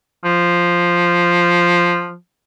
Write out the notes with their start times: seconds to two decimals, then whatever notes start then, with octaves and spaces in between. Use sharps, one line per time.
0.25 F3